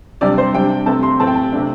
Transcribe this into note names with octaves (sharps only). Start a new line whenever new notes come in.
C3 G3 D4 D5
C5
C3 G3 D4 G5
C3 A3 C4 A5
C6
A2 A3 C4 A5
G5
A5
C3 A3 D4